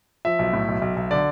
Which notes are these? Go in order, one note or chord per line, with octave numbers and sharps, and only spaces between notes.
F3 E5
B1
A2
B1
B1
B1
D3 D5